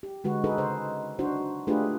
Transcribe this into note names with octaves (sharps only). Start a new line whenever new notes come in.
G4
D3 G#3 F#4 B4
D#4 G#4 A4 B4
C#3 C5
D4 D#4 F#4 C5
A3 D4 F4 G4 G#4 B4